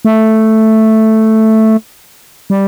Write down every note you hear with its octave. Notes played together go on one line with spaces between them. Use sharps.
A3
G3